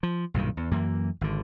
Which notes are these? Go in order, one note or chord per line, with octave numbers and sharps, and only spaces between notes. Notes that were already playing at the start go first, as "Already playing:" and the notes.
F3
B1 G2 A#2 D#3
E2
F#2 E3 A#3
G#1 D3